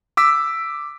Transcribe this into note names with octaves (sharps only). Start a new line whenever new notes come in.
D6 E6 B6